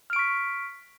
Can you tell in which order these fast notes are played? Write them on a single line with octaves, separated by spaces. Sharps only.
F6 D7 C#6 B6